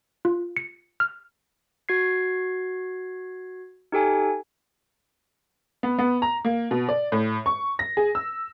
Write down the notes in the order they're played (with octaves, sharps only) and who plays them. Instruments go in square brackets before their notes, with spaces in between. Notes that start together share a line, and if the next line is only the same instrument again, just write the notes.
[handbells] F4
C#7
F6
F#4 G#6 C7
D#4 G4 A4 G#5
[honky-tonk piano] B3
B3
A#5
A#3
B2
D5
A2
C#6
A#6
G#4
E6